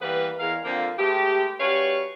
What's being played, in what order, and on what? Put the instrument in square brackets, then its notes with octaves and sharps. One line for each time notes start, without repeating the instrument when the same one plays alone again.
[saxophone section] E3 G3 A#3 B3 B4
E2 G#3 A#4 F5
D3 F3 A#3 C4
G#3 A3 B3 G4
G3 C#4 F#4 B4 C#5 F5